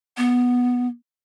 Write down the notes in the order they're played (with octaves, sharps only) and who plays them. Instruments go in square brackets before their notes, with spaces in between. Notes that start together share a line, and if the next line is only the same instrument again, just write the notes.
[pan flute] B3